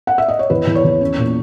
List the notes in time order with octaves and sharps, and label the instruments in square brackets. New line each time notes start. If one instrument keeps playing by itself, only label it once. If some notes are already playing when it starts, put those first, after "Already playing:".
[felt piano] F#5
E5
D#5
C#5
E2 B4
E2
C#5
E2
C#4
A#2